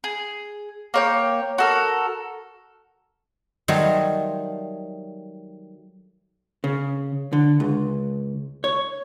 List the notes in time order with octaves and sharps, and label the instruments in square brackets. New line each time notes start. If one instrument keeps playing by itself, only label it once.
[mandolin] G#4
A#3 C#5 G5
F#4 A4 A#4
[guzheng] D#3 F#3 G3 A3 C5
[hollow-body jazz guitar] C#3
D3
C#2
C#5